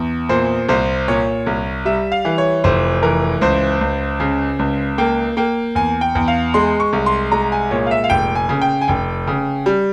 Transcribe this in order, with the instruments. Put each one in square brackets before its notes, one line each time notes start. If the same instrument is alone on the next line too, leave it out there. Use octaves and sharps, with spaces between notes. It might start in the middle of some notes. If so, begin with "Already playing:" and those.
Already playing: [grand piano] E2
A#2 C5
C2 C5
A#2 C#5
C2
G3 E5
F5
E3
C#5
F1 C5
E3 A#4
C#2 C5
C#2
C#3
C#2
A#3 G5
A#3 G5
E2 G#5
G5
E2
F5
G#3 C6
C#6
C2
C6
G#3 A#5
G#5
A#2 C#5
F5
E5
F5
F1 G5
G#5
C#3
G5
G#5
F1 G5
C#3
G3